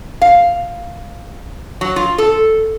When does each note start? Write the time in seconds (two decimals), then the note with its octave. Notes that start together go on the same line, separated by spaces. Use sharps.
0.22 F5
1.81 F#3
1.96 F4
2.18 A4